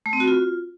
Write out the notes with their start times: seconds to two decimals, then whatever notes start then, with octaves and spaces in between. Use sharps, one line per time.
0.06 A3
0.13 C4
0.20 F#4
0.28 F4